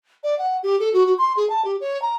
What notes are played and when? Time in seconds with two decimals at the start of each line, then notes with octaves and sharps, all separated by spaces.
0.23 D5
0.39 F#5
0.63 G4
0.80 A4
0.93 F#4
1.06 F#4
1.18 C6
1.37 G#4
1.50 A5
1.65 G4
1.81 C#5
2.02 A#5